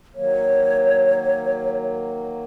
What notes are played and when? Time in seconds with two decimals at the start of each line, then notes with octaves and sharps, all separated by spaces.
0.15 D#3 F#3 A#3 C#5